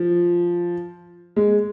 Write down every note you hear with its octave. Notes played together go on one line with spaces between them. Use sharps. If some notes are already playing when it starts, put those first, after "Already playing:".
Already playing: F3
G#3